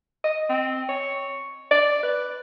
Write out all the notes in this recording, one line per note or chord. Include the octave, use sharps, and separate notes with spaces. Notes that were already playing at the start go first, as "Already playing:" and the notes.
D#5
C4
C#5
D5
B4